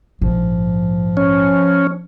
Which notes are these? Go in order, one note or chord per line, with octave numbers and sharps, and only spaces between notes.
A#1 G#2 F3
C#4